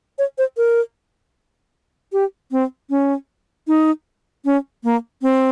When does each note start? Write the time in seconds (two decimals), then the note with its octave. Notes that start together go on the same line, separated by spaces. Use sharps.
0.19 C#5
0.38 C5
0.57 A#4
2.13 G4
2.51 C4
2.90 C#4
3.67 D#4
4.45 C#4
4.84 A#3
5.22 C4